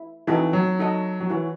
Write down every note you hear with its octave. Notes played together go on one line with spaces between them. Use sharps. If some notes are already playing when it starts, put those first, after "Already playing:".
Already playing: E4
E3 C4 D#4 F#4 A4
F#3
D#4 F#4 A4 D#5 F#5
F#3
E3 F#4 C#5 F#5